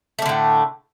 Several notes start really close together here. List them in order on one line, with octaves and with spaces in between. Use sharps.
A3 G3 D3 A2